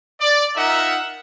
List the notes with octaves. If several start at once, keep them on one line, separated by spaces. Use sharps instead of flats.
D5
D#4 F4 A#4 E5 F#5